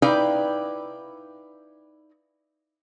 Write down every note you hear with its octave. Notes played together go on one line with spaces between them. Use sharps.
D#4 E4 B4 D5 F5 G5